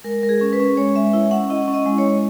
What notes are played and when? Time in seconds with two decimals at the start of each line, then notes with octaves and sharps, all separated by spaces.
0.04 G#3 A#4
0.23 G#3 A#4
0.29 G#4
0.41 C#4
0.53 B4
0.60 C#4
0.77 G#3 C#5
0.95 G#3 E5
1.13 E4 E5
1.31 C#4 F#5
1.50 E4 D#5
1.68 C#4
1.74 D#5
1.86 G#3
1.98 C#5
2.05 G#3